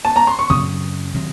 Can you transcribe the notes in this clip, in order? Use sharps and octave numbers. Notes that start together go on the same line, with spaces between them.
A5
A#5
C6
C#6
F#2 C#3 F#3 C4 D#6
C3 D#3 F#3